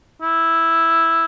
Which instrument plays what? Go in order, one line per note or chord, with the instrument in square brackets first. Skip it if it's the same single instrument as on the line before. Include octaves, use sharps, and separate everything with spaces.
[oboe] E4